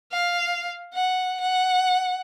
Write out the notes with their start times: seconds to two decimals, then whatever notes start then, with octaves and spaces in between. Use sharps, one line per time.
0.12 F5
0.94 F#5
1.40 F#5